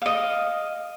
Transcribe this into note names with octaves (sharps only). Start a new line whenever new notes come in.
D#5 F5